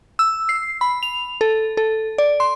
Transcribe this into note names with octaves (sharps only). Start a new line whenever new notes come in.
E6
C7
B5
F7
A4
A4
D5
C6